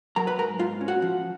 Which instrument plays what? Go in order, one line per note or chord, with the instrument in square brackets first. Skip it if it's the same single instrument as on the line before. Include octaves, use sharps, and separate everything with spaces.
[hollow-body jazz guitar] F#3 A#4 A#5
B4 B5
G#2 A#4 A#5
G#2 F4 F5
C#4
F#4 F#5
F3